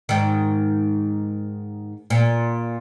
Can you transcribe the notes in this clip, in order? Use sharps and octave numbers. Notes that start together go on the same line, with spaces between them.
G#2 D#3
A#2